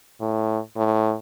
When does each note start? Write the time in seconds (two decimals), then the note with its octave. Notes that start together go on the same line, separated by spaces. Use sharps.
0.21 A2
0.76 A2